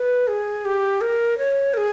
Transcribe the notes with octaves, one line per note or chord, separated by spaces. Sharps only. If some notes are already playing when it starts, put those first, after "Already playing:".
Already playing: B4
G#4
G4
A#4
C#5
A#4
G#4